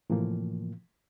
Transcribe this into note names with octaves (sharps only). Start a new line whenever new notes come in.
A2 C3 E3 F3 A#3